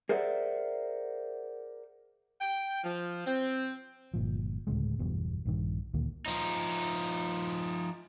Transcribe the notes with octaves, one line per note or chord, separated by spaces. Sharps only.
G#4 A#4 C5 D5 E5 F#5
G5
F3
C4
G1 A#2 F3
D2 A2 C#3 G#3
F#1 E2 G2 B2
A#1 G2 D#3
D2 A#2 D#3 A#3
F3 D#4